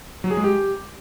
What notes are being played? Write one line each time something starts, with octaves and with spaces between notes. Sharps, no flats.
F#3
G#4
G#3
G4